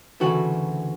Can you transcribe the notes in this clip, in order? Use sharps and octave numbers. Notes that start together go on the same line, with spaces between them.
D2 C#3 E3 A3 F#4